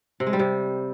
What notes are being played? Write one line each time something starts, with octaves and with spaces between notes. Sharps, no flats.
C3
G#3
G3
C3